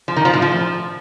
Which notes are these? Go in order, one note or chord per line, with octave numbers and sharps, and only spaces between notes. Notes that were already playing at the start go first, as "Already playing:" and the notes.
F3
D#3
F3
A2
F3